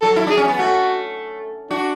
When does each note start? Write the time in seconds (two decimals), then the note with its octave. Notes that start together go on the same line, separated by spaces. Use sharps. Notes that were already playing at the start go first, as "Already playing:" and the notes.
0.02 F#3 A4
0.16 E4
0.27 D4 G#4
0.37 C#4
0.48 B3
0.59 A3 F#4
1.70 D4 F#4